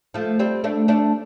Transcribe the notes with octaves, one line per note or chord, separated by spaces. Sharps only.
F3 A3
G3 C4
A3 D4
A3 D4